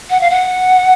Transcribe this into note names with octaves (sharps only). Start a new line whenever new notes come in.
F#5
F5
F#5